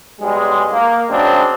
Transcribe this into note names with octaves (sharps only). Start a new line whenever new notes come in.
B1 G3 G#3
A#3
C#3 F#3 G#3 C4 D4